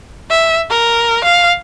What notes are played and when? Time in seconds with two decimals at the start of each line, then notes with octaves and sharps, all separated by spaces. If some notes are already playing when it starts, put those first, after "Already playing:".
0.30 E5
0.70 A#4
1.24 F5